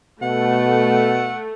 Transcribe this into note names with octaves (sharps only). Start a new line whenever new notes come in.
B2 A3 F#5